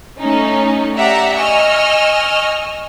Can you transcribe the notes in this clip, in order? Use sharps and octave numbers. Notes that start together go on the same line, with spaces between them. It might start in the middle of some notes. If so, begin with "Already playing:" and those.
A3 C#4 D#4
G4 D5 E5 F#5 A#5
D#5 G#5 C#6 E6 F6